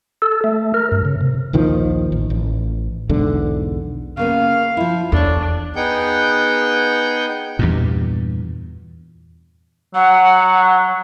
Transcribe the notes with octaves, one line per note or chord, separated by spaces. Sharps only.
A4
A3
A#4
G2
C#3
C3
A#1 D#2 D#3 F3
A1
A1
B1 E2 G#2 D3
C#3 A#3 B3 F5
F3 E4
E2 D4 A4 C#5
B3 D#4 G#4 F#5 G5 G6
E2 G2 A#2
F#3 F#5